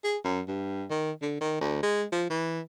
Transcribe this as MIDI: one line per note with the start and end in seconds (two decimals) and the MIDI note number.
0.04 0.17 68
0.24 0.41 42
0.48 0.84 43
0.90 1.12 51
1.22 1.37 50
1.41 1.56 51
1.61 1.80 38
1.82 2.04 56
2.12 2.27 53
2.30 2.60 52